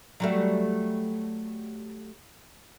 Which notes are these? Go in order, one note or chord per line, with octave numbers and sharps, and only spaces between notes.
F#3 G3 A3